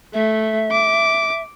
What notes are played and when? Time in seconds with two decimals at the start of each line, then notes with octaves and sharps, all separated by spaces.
0.14 A3 E5
0.72 D6